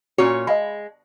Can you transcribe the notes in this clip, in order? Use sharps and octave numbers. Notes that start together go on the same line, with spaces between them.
A#2 C#4 F#4 C#5
G#3 D#5 F5 B5